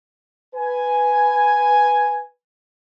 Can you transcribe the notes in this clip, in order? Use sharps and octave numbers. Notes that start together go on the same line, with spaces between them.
B4 G#5